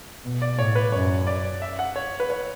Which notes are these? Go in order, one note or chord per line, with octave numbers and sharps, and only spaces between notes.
B2
D5
A2 C#5
B4
F#2 C#5
D5
E5
F#5
C#5
B4
C#5